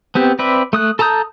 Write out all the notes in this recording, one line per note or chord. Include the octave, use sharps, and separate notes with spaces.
B3 C4 G4
C4 B4 D5 E5
A3 D#6 F#6
A4 A5 A#5 D#6 G6